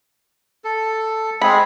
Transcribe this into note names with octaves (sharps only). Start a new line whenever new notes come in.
A4
G#3 C4 G#4 B5